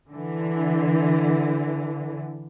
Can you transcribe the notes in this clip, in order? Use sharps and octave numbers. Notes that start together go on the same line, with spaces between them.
D3 E3